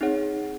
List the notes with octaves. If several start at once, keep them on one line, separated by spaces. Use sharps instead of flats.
C4 D#4 G#4 C#5 F#5